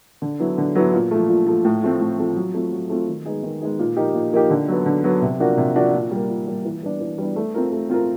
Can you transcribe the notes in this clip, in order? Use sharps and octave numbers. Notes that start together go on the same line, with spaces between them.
D3
F#3 B3 E4
D3
F#3 B3 E4
A#2
F3 A3
A#2
F3 A3
A2
F3 A3 C4
A2
F3 A3 C4
F#3
A3 C4 F4
F#3
A3 C4 F4
D#3
G#3 B3 D#4 G#4
D#3
G#3 B3 D#4 G#4
A#2
F3 A#3 D#4 G4
A#2
F3 A#3 D#4 G4
D3
F#3 B3
D3
F#3 B3
C3
F3 A#3 D4 F#4
C3
F3 A#3 D4 F#4
A#2
G3 A#3
A#2
G3 A#3
E3
G3 B3 D4
E3
G3 B3 D4
A3
C4 F4 A#4
A3
C4 F4 A#4